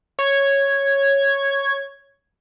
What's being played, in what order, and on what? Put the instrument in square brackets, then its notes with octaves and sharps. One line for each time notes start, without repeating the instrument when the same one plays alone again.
[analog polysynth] C#5 G#6